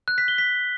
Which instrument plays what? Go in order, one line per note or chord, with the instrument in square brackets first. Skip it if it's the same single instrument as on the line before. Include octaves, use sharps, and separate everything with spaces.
[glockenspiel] F#6
B6
G7
B6